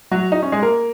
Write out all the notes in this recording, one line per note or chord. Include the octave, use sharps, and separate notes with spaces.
F#3 F#4
D#4
C#4
G#3 G#4
A#3 A#4